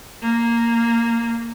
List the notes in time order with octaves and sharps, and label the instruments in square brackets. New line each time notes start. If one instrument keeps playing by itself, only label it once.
[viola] A#3